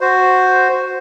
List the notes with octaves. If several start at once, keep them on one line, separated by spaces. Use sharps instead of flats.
F#4 C5